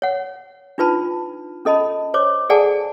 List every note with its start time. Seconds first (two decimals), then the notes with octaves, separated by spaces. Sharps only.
0.02 C#5 F#5
0.78 D4 D#4 F4 B4 A5 B5
1.65 C#4 A4 D#5 A5 B5
2.14 C5 C#5 D6
2.50 G#4 A4 D5 F#5 G#5 A5